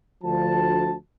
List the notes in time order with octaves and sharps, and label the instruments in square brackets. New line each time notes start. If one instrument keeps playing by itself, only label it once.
[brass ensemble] D2 F3 A5